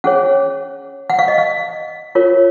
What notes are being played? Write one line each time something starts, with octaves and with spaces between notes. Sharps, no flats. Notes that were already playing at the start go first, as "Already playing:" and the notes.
C#4 G#4 C#5 F#5
F#5
F5
D#5
F5
F4 A#4 C#5